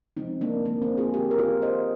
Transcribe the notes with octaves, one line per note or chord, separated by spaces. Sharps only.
C3 F3 G#3 C4 D#4
A#3 D4
A#3
C4
F4 G#4
D#3 A#3 G4 A#4
A#4
F4 G#4
C5 D#5